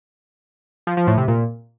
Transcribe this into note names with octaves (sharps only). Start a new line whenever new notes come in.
F3
F3
A2
C3
A#2